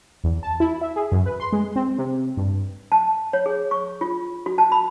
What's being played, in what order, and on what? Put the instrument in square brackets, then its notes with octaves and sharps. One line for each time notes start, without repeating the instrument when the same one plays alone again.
[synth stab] E2
A5
E4
E5
G#4
F#2
B4
C6
G#3
C4
C3
G2
[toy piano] A5
C#5
G#4
C#6
F4
F#4
A5
B5